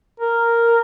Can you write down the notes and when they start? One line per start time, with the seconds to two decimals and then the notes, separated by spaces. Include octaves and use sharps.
0.20 A#4